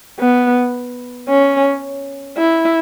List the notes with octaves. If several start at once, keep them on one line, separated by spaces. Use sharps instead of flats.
B3
C#4
E4